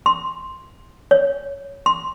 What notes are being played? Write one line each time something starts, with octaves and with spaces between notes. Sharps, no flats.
C6
C#5
C6